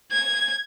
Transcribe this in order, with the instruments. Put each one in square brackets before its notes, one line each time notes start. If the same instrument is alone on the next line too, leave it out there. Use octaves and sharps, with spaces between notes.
[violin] G#6